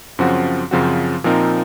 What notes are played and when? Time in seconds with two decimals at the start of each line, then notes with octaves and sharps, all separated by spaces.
0.19 F#2 C#3 F3 C4 F#4
0.71 F#2 C#3 F3 C4 F#4
1.24 A#2 F3 C4 D#4 A#4